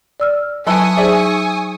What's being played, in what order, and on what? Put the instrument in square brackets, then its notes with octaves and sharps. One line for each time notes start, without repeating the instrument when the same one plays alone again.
[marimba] D5 E6 F6
[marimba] F#3 [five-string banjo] E4 A4 B4 [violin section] G#5 C#6 D#6
[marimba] D#4 G#4 C5 [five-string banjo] D5 E5